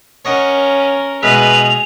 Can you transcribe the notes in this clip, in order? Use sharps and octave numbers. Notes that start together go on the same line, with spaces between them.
C#4 A#4 C#5 D#5 F#5
B2 G#3 G#4 B4 E5 F7